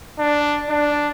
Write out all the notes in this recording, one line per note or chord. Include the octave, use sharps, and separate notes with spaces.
D4
D4